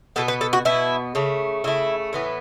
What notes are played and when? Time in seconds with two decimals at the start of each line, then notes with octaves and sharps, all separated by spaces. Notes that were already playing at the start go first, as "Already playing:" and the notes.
0.16 B2 B3 A4
0.28 B4
0.41 A4
0.53 F#4
0.65 B2 B3 E4
1.15 C#3 A3
1.64 C#3 A3 E4
2.13 A2 E3 B3